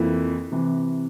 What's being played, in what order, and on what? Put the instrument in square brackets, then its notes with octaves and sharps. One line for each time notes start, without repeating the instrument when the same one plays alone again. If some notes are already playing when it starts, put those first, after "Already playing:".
Already playing: [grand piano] F2 E3 A#3 E4
C3 E3